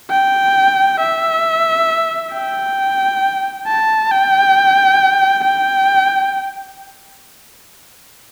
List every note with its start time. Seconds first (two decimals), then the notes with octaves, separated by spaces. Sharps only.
0.11 G5
1.01 E5
2.33 G5
3.67 A5
4.12 G5
5.45 G5